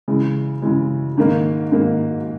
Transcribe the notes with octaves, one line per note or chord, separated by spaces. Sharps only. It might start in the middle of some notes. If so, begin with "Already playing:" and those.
C#3 E3 G#3
C#3 E3 G#3
G#2 D#3 A#3
G#2 D#3 A#3